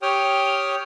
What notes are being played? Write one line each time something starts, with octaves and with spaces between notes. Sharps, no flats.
G4 C#5 G5 D#6 F6